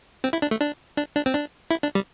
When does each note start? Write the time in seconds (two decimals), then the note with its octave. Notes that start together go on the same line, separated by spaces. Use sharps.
0.24 C4
0.33 E4
0.42 D4
0.51 A3
0.61 D4
0.97 D4
1.16 D4
1.26 C4
1.34 D4
1.71 E4
1.83 D4
1.95 G3